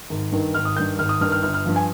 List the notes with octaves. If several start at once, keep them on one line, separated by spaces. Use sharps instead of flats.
G#1
G2 D#3
G#1 F6
D#6
G2 D#3 G6
G#1 F6
D#6
G2 D#3 F6
F6
G1 F6
F6
G2 F3
G#5